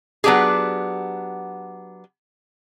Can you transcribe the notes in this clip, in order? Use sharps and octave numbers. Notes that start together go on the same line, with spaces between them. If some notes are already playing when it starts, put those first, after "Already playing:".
F#3 B3 D4 G4 G#4